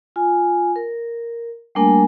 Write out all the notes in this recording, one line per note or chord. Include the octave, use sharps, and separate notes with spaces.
F4 G#5
A#4
G3 A3 A#3 D4 A#4 G#5